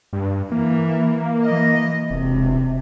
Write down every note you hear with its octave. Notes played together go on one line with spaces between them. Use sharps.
G2
E3 A#3
E3 D#5
E1 C3